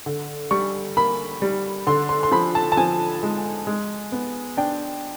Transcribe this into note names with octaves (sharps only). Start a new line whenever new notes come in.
D3
G3 C#6
A#3 B5
G3
D3 C6
C6
C6
F3 B5
A5
A5
F3 G#5
G#3
G#3
B3
D4 G5